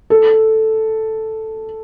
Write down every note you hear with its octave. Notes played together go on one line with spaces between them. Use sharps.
A4